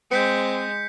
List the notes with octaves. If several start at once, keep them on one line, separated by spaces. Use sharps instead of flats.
G#3 C4 G6 B6 C#7